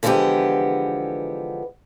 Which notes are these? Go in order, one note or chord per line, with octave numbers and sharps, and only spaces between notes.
D3 E3 F3 G#3 B3 G4